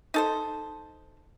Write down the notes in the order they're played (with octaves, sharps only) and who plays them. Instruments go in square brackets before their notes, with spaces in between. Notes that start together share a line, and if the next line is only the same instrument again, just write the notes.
[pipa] D#4 A4 C5